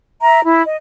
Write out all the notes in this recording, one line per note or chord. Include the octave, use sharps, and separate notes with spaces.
E5 A#5
E4
D#5